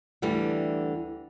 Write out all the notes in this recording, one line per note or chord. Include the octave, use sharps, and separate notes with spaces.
D2 D3 E3 G3